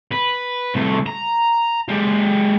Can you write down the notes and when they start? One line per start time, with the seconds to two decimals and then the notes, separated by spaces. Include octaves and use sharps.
0.12 B4
0.75 C2 A3
1.06 A#5
1.88 G#3 G4